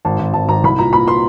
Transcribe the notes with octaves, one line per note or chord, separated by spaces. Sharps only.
G#1 A5
G#1
G#1 A5
G#1 A#5
C2 B5
A#2 A#5
A#2 B5
C6